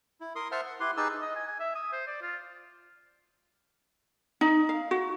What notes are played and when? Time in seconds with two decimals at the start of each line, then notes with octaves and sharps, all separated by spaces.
0.21 E4
0.36 A#4 C6 D#6
0.52 C5 E5 F#5 A5 F6
0.66 F#5
0.80 E4 G4 B4 C6
0.97 D#4 G4 G#4 B4 A5 E6
1.22 D#5
1.36 G#5
1.47 G#5
1.60 E5
1.75 D#6
1.93 C5
2.07 D5
2.22 F4
4.41 D#4
4.69 F5
4.91 F#4